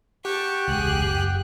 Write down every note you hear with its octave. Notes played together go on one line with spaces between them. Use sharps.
G4 F#5 G5 A5 C#6
E1 C#2 G#4 F#6
F#1